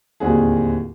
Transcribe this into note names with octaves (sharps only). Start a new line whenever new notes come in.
D1 D#2 G3 C4 F#4 G#4